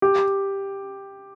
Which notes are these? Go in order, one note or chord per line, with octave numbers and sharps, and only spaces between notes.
G4